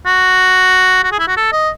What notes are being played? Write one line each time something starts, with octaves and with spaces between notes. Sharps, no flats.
F#4
F#4
G#4
E4
F#4
A4
D#5